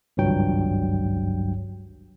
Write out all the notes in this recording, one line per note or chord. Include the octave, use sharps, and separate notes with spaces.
G#1 C#2 G2 F#3 G5